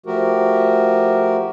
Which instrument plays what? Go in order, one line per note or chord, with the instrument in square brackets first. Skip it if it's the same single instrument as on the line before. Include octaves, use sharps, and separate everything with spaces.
[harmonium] F3 A3 F#4 G4 A#4